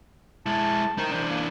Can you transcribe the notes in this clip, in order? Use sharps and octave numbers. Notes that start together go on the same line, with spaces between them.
G#3 E4 A5
D#4 A#4 C5
E3 D4 C5
A#3